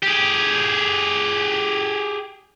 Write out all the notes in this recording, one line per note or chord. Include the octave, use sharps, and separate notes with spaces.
G4 G#4